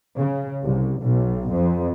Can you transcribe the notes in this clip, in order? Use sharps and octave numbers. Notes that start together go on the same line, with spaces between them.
C#3
C2
B1
F2